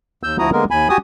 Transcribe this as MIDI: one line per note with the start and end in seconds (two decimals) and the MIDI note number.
0.23 0.37 39
0.23 0.37 88
0.23 0.37 91
0.39 0.50 38
0.39 0.50 53
0.39 0.50 64
0.39 0.50 66
0.39 0.50 82
0.39 0.50 87
0.53 0.65 50
0.53 0.65 56
0.53 0.65 58
0.53 0.65 59
0.53 0.65 70
0.71 0.88 39
0.71 0.88 80
0.71 0.88 83
0.89 0.97 66
0.89 0.97 67
0.89 0.97 80
0.89 0.97 87